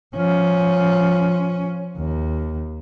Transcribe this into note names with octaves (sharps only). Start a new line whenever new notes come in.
F3 C#4
D#2